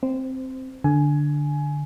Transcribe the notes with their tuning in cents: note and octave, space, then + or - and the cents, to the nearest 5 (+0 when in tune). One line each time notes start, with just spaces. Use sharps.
C4 +0 C5 -20
D3 +0 G#5 +15